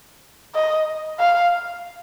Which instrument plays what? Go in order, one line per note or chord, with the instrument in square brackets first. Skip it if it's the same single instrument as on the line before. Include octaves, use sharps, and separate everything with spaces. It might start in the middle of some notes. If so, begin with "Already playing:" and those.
[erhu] D#5
F5